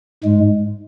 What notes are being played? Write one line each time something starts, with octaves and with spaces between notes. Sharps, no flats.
G#2 G#3